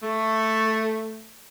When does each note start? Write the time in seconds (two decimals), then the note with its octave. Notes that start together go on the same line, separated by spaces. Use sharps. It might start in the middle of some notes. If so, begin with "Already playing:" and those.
0.03 A3